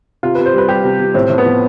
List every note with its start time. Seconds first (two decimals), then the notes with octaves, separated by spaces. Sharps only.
0.23 C3 F4
0.35 C3 B4
0.46 C5
0.54 G3 B4
0.69 G3 G4
0.84 C3
0.99 C3
1.14 A2 C4
1.30 A2
1.38 B3
1.46 F3